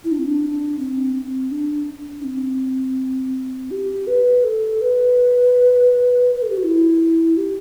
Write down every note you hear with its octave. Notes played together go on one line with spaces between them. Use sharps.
E4
D4
C4
D4
C4
C4
D4
D4
C4
G4
B4
A4
B4
B4
A4
G4
F#4
E4
G4